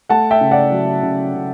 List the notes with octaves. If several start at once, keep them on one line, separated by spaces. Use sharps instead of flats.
A3 F#5 A5
E5 G5
C#3
D5 F#5
F#3
C#3
C#3